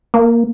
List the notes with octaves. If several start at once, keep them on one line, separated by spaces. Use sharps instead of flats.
A#3